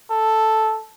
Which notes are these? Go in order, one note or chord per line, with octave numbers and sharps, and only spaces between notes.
A4